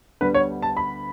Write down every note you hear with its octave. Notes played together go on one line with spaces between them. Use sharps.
D2 D3 G3 B3 B4
C#5
A5
B5